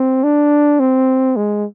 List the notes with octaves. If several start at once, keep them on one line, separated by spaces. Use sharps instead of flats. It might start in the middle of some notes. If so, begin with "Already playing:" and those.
Already playing: C4
D4
C4
G#3